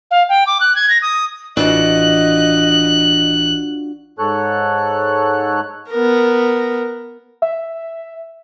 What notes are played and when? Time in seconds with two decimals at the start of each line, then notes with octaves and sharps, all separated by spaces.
0.11 F5
0.29 G5
0.47 D6
0.61 F#6
0.76 G#6
0.90 A#6
1.02 D#6
1.57 A1 E3 D4 F4 F#4 D#5 F#6
4.19 G#2 A4 C#5 F#6
5.90 B3 A#4
7.42 E5